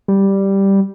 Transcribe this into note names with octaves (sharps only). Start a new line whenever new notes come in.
G3